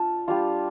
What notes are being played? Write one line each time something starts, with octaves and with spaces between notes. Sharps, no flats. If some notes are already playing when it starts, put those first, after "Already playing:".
Already playing: D4 F4 A5
G3 D4 F4